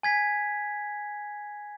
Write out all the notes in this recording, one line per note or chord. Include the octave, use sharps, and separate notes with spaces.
G#5 G#6 B6